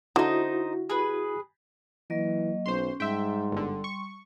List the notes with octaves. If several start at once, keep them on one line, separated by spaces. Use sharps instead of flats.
D3 D#4 E4 F#4 C5
G#4 B4
E3 F#3 A#3 D#5
B1 C#4 C5 C6
G#2 G3 E5 G5 C6
G1 D3
C#6